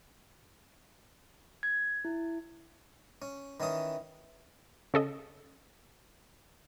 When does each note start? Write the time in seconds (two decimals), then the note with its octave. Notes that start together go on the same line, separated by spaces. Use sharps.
1.63 G#6
2.05 E4
3.22 C#4
3.60 D#3 E3 C#4 D#6
4.94 C#3 A4 D#5